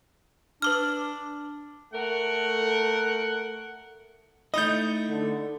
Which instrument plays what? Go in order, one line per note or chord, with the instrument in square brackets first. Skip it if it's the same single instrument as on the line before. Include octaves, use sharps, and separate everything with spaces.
[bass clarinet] D4 [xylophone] B4 D6 F6
[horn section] A3 A#4 F#5
[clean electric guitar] A3 D#4 E4 [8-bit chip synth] D#5 G6
[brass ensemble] D3